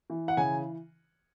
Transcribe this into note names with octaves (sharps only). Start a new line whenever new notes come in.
E3
F#5
C#3 G#5